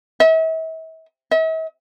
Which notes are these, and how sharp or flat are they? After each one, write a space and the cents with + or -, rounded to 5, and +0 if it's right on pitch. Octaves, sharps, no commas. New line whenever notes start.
E5 -40
E5 -45